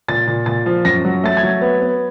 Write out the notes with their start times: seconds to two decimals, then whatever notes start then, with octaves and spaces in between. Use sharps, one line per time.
0.08 A#2 A6
0.27 A#2
0.46 A#2 A6
0.66 F3
0.85 F#2 A#6
1.05 F#3
1.24 A3 A6
1.37 G#6
1.43 F#3
1.62 B3
1.81 B3